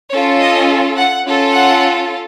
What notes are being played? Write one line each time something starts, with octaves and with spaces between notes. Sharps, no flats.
C#4 F4 A4 C#5
D#5
F#5
C#4 F4 A4
F#5